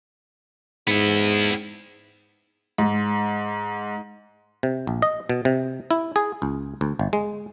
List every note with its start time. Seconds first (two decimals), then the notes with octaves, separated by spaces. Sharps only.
0.87 G#2 B3 E4
2.78 G#2
4.63 C3
4.87 A#1
5.02 D#5
5.30 B2
5.45 C3
5.91 E4
6.16 G#4
6.42 C#2
6.81 D2
6.99 G1
7.13 G#3